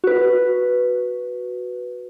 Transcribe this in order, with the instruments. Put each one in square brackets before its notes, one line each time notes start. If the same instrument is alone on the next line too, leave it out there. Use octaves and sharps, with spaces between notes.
[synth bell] F#4 B4